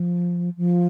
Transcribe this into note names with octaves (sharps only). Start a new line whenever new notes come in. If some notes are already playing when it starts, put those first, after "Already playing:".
Already playing: F3
F3